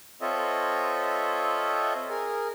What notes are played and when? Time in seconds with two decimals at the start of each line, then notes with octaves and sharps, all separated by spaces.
0.21 C4 F4 A4 C#5 D#5 E5
2.10 G#4 A#4